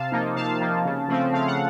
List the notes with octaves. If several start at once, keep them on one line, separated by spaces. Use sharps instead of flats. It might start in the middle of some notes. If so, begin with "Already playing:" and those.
Already playing: C3 F5 A5
F3 A#3 D#4
C3 F5 A5
F3 A#3 D#4
C#3
F3 A3 C4
C#3 F5
F#5